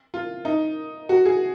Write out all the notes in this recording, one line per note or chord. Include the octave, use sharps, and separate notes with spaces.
F4
D#4
F#4
G#4